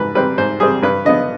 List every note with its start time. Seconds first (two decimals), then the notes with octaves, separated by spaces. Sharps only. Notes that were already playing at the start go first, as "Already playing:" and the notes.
Already playing: G#2 G3 B4
0.15 G3 C4 B4
0.38 G#2 C5
0.60 G3 C4 G#4
0.83 G2 B4
1.05 D3 F3 B3 D#5